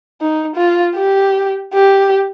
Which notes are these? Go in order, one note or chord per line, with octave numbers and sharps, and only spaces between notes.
D#4
F4
G4
G4